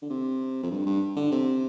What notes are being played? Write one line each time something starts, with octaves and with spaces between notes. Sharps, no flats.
D3
C3
F2
G2
G2
D3
C3